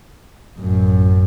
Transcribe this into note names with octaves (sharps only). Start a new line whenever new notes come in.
A1 F#2